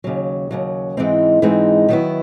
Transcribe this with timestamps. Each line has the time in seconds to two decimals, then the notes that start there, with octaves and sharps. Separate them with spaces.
0.04 D#2 C#3 F#3
0.51 D#2 C#3 F#3
0.97 G#2 E3 G#3 C4 D#4
1.42 G#2 E3 G#3 C4 D#4
1.89 D#3 F#3 B3 E4